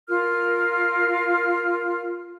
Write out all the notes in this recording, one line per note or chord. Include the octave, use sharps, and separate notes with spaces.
F4 A#4 F6